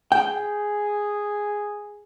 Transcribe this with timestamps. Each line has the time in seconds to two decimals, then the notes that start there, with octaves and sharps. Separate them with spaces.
0.12 G#4 G5